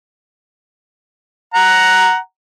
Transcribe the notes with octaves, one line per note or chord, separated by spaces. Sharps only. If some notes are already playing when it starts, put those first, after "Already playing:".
F#5 A#5